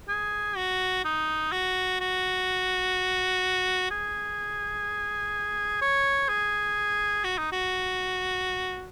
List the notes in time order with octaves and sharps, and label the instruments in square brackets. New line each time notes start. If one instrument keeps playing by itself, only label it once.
[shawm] G#4
F#4
D#4
F#4
F#4
G#4
C#5
G#4
F#4
D#4
F#4